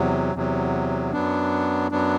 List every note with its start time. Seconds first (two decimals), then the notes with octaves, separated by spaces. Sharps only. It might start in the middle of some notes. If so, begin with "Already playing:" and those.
Already playing: E2 C3 F#3
0.35 E2 C3 F#3
1.13 F#2 F#3 B3 D4
1.91 F#2 F#3 B3 D4